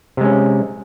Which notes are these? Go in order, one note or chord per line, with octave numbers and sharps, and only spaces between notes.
C3 G#3 C#4